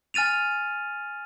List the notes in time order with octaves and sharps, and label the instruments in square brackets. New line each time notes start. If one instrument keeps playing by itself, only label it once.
[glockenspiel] G#5 F6 A6 D#7 F7